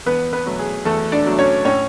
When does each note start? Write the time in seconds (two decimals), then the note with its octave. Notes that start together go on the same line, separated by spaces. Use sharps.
0.06 E2 B3 B4
0.33 B3 B4
0.46 B2 F#3 A3
0.59 G#4
0.85 E2 A3 A4
1.12 D4 D5
1.26 B2 F#3 A3
1.39 C#4 C#5
1.65 A2 C#4 C#5